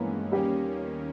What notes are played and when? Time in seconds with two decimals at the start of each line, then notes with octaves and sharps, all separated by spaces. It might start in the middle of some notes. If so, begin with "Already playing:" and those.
Already playing: G2 E3 G#3 A#3 B3 C#4 A#4
0.32 D#2 D#3 G3 A#3 C#4 G4